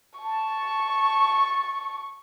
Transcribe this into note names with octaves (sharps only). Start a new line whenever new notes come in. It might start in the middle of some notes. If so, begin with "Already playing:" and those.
A5 C#6